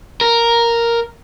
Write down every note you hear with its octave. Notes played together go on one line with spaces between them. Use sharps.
A#4